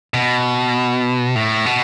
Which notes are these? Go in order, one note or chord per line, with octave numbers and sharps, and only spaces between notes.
B2
A2
B2